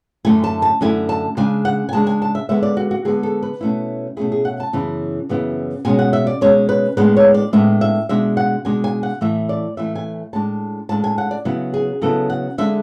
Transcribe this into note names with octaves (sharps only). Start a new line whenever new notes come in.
F#2 D3 A3 E4 G#5
A5
A5
F#2 D3 A3 E4 G#5
A5
C#3 G#3 D4 G#5
F#5
G#5
C#3 G#3 D4 A5
G#5
A5
E5
D3 G#3 B3 E5
D5
F#4
F#4
D3 G#3 B3 G#4
A4
B4
B2 A3 C#4 E4
B2 A3 C#4 E4 G#4
G#4
F#5
A5
F#2 C#3 E3 B3 E4
F#2 C#3 E3 B3 E4
B2 G#3 C#4 G#5
F#5
E5
D5
B2 G#3 C#4 C#5
B4
A2 G#3 B3 D4 B4
C#5
D5
A2 G#3 B3 D4 E5
E5
B2 G#3 D4 E5
F#5
B2 G#3 D4 G#5
G#5
F#5
A2 E3 A3 E5
D5
A2 E3 A3 E5
G#5
A2 G#3 D4 A5
A2 G#3 D4 A5
G#5
F#5
D5
C#3 F#3 B3 E4
G#4
C#3 F#3 B3 E4 A4
F#5
D3 G#3 D4 E5